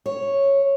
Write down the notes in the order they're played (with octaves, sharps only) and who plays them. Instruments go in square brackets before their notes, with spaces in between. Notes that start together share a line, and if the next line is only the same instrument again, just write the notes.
[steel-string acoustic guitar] C#5